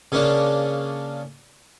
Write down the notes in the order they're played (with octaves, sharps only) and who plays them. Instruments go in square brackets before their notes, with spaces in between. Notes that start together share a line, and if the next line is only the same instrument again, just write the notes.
[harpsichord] C#3 A#3 D4